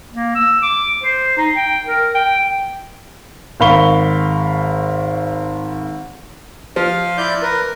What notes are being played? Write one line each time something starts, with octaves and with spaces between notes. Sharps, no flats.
A#3
E6
D6
C5
D#4
G5
A#4
G5
G#1 A#4 F5 B5 C#6 G7
F3 F5
E4 D5 G6
A#4 B4